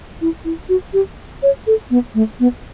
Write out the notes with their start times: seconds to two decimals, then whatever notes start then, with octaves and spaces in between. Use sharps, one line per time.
0.21 E4
0.45 E4
0.69 F#4
0.93 G4
1.43 C#5
1.67 A4
1.90 B3
2.15 A3
2.40 B3